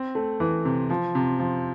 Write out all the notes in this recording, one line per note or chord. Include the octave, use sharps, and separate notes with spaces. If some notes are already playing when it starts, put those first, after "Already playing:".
Already playing: C4
A3
E3
C3
F3
C3
F3